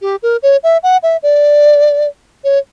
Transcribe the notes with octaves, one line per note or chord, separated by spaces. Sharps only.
G4
A#4
C#5
E5
F#5
E5
D5
C#5